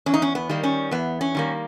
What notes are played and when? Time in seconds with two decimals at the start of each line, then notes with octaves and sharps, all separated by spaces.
0.06 E2 C#4
0.14 D#4
0.22 C#4
0.35 B3
0.49 D#3 G3 A#3
0.63 C#4
0.91 E2 B3
1.21 C#4
1.35 D#3 G3 A#3